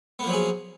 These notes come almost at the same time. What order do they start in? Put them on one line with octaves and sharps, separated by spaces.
B3 A#3 F3 F#3 G#4